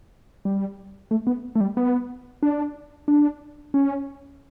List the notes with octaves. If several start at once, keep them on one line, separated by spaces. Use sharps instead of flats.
G3
A3
B3
A3
G3
B3
D4
D4
C#4